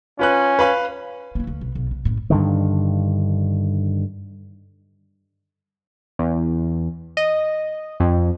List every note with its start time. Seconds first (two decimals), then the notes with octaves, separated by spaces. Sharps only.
0.19 C#4 F4 B4 F#6
0.59 B4 F5 B5
1.35 A#3 E4
1.47 D2
1.61 B1
1.75 B1
1.91 C3
2.05 F#1 A2
2.30 G2 D3 D#3
6.19 E2
7.17 D#5
8.00 F2